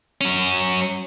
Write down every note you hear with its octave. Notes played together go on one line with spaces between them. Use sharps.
F#3 C#4